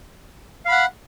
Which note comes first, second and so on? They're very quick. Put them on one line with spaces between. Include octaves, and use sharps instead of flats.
F5 B5 F#5